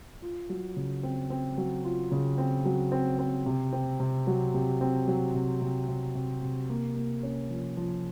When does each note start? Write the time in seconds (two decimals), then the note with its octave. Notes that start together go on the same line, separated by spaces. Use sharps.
0.22 F4
0.49 F#3
0.76 C#3
1.03 C4
1.30 C4
1.58 F#3
1.84 F4
2.12 C#3
2.38 C4
2.65 F#3
2.92 C4
3.19 C4
3.46 C3
3.73 C4
4.00 C3
4.27 F#3
4.54 C3
4.81 C4
5.08 F#3
5.35 C3
5.62 C3
5.88 C3
6.15 C3
6.43 C3
6.70 A#3
6.96 A#3
7.23 C#4
7.50 F3
7.77 F3